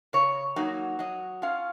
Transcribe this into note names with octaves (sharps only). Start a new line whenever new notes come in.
C#3 C#5
F#3 A#3 D#4
F#3 D#5
C#4 F4 F5